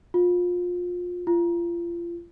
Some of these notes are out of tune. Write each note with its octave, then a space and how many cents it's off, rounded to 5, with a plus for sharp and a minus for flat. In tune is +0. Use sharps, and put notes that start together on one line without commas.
F4 +25
F4 -30